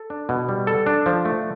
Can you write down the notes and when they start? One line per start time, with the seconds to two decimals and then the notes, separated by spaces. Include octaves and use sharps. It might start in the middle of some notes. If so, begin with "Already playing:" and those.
Already playing: A4
0.10 D4
0.29 B2
0.49 G3
0.67 A4
0.86 D4
1.06 F3
1.25 A3